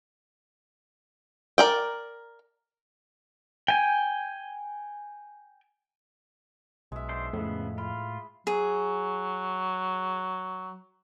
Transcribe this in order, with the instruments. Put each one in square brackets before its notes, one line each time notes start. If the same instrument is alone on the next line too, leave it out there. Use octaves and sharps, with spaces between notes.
[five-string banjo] A#4 D5 G5
[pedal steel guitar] G5 G#5
[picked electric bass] B1 [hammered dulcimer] G#3 E5
[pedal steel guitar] D4 C5
[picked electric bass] F2 [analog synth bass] A2 [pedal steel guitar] C#3 B3
[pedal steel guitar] F4 [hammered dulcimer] B5
[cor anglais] F#3 [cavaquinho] G#4